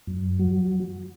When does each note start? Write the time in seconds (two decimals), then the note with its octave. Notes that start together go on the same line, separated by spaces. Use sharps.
0.07 F#2
0.39 F#3